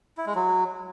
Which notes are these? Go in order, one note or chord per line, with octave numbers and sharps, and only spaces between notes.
E4
G#3
F#3